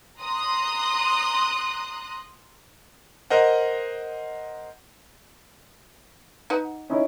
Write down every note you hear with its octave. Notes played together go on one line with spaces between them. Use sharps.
A#5 C6 D#6 F#6
A#4 C5 D#5 F#5
D#4 B4 F#5
C#4 D#4 E4